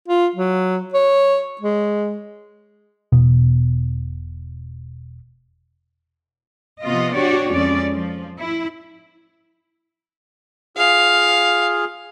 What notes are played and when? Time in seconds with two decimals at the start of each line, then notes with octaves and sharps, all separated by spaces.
0.08 F4
0.35 F#3
0.93 C#5
1.61 G#3
3.12 E1 B2 B3
6.84 C3 F3 B3 F4 D#5
7.15 D4 F#4 G4 C#5 D5
7.51 F2 G#3 C#4 D5
7.94 F3
8.38 E4
10.77 F4 G#4 F5